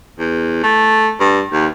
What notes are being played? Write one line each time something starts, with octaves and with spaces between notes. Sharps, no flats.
E2
A3
G2
D#2